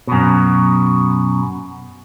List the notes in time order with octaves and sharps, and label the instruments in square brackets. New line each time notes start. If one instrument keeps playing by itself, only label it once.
[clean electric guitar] F#2 B2